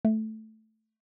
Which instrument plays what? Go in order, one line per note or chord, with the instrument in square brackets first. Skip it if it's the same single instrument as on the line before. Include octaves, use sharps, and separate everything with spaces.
[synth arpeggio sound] A3